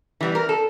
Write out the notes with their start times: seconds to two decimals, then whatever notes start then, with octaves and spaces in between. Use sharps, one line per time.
0.21 E3 G3 B3
0.35 A#4
0.49 A4